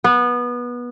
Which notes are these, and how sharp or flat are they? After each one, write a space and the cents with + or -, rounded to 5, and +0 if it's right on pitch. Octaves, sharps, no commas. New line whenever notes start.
B3 -20